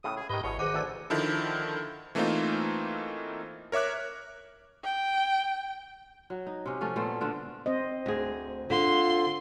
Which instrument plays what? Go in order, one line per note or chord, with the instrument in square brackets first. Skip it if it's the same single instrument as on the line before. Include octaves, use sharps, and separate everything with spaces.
[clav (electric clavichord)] A2 C#3 [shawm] D#6
[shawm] G#4
[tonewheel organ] G#2 G4 [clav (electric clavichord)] D#3 B4 [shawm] D#5
[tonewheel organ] G#1 [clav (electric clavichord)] E2 B2 [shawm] C#5
[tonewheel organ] D#3 B4 [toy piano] G#4 C5 D6 [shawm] F#5
[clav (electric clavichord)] D2 A4 A5 [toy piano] C5 D5
[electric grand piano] D3 D#3 F3 E4 A4
E3 A3 A#3 C4 D#4 F4
A#4 C#5 E5 D6 F#6
[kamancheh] G5
[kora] F#3
D#4
C3 C#4
F3 A3 C#4 F#4
A#2 A3 B3 C5
D3 D4 F4
[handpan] C4 C5 D#5
[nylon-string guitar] D2 G#4
[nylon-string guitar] D3 [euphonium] F4 [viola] C6